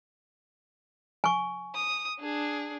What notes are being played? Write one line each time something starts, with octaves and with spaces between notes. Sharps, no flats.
G#5 C#6
D#6
D4 G#4